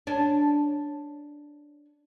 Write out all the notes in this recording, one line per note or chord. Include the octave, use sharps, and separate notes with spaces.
C#4 D4